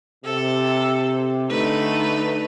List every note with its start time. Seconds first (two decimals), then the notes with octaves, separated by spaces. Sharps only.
0.25 C3 A4
1.50 D3 A3 D#4 B4